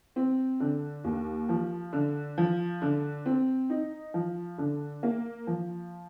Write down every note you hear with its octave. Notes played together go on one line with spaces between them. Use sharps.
C4
D3
D#2
F3
D3
F3
D3
C4
D#4
F3
D3
A#3
F3